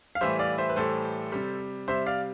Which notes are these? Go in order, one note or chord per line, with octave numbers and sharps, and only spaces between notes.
F5
A2 E3 G3 C5 E5
D5 F5
C5 E5
B4
A2 E3 G3 A4 C5
C3 G3
C3 G3 C5 E5
D5 F5